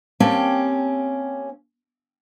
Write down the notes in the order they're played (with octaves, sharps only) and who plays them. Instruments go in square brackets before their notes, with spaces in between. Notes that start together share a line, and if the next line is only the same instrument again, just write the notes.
[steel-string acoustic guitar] A#3 C4 C#4 G4 G5 A5